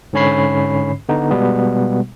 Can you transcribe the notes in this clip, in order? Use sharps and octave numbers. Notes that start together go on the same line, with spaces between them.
G#2 D3 C#4 C#5 B5 C7
D3 B3 D#4
B2 G3 G#3 B3